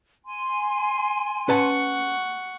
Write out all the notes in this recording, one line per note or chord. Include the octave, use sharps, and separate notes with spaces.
G#5 C6
C#4 B4 F#5 A5 C#6